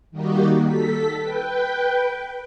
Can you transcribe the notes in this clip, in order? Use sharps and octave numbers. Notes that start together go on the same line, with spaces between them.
D#3 G3 A#3 D#4 F#4 G4
A4 B6
B4 G5